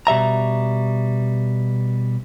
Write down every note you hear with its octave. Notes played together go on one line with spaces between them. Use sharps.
B2 G3 E5 A#5